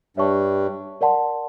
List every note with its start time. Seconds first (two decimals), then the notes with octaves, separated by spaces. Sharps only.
0.17 G2 G3 C#5 E5 A5 C#6
1.01 A#4 D5 F#5 A5 C6